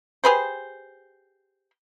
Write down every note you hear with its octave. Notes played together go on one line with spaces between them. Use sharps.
G4 G#4 B4 C5